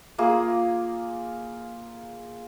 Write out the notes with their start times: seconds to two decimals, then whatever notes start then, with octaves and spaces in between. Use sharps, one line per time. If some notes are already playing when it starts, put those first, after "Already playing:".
0.18 A#3 F4 G#4